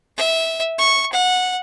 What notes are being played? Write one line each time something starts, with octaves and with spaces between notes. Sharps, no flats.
E5
C#6
F#5